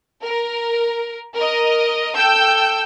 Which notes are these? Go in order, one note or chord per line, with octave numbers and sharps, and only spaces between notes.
A#4
A#4 D#5
A4 G5 E6 G6